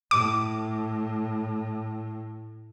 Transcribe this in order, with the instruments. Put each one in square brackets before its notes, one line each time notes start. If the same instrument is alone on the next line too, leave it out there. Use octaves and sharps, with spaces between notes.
[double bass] A2 [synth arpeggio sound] D6